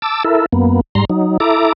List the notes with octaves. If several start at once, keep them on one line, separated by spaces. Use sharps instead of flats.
A5 D6 E6
E4 A4 A#4 E5
F#2 A#3 B3
G#2 G3 A#5 C6
F#3 D#4
E4 A4 E5 A#5 D6